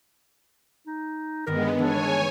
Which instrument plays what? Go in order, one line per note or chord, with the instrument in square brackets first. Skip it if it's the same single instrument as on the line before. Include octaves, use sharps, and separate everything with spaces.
[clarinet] D#4
[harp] G1 G2 D#3 [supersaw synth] G#3 B3 [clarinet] A#4
[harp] E3 [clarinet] D4 [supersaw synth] C#5 G#5